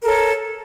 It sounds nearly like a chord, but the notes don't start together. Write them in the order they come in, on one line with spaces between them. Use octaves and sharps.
A#4 A4 C#5